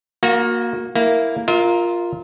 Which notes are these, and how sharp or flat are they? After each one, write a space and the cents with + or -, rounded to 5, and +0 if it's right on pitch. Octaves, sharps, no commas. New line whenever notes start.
A#3 +10 F#4 -25
A#3 -5 E4 +0
F4 +0 A#4 +0 E5 -40